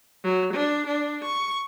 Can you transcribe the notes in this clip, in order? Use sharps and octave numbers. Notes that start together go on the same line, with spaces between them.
F#3
D4
D4
C#6